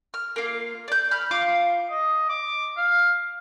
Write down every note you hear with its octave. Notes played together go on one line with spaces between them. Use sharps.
F6
A#3 F4
D5 G6
B5 F6
F4 F5 D6
D#5
D6
F5